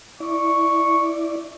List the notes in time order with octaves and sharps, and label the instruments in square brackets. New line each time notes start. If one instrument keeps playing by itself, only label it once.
[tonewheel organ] E4 D5 [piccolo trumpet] C#6